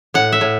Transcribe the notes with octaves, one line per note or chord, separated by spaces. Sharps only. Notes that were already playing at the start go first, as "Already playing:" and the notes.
A2 F#5
E5
A2